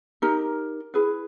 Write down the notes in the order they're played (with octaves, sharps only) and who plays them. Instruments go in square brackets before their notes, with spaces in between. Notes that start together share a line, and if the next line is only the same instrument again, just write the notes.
[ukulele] D#4 G4 A#4
E4 G#4 B4